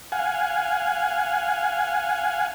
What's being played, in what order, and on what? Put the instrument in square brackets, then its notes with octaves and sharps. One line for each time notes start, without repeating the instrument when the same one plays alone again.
[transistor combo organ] F5 F#5 G#5